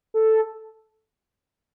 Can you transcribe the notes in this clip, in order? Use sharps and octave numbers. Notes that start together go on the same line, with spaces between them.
A4